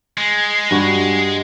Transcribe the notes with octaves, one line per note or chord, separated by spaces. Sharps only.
G#3
G2 F#4